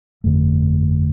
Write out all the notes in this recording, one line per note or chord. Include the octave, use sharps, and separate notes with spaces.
G1 F2 D3 A3